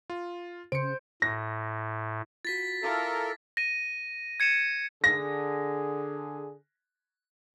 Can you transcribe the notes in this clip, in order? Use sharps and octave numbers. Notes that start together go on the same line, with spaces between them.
F4
C#3 C5 C#7 D7
A2 A#6
F4 F#4 A6 B6
E4 F4 A4 A#4 A5 D6 C7
A#6 D#7
G#6 C#7 D#7 E7
D3 G#4 A#6